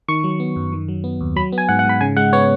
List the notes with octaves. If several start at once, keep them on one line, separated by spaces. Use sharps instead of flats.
D#3 C#6
F#3
B3
F#2
D#3
F#3
B3
D#2
F#3 B5
B3
G#5
G#2 F#5
F#5
G#2 B5
C#3 G#5
G#3 F#5
B3 C#5